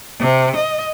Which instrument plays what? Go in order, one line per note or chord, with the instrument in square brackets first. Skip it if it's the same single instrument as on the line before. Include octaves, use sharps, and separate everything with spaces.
[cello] C3
D#5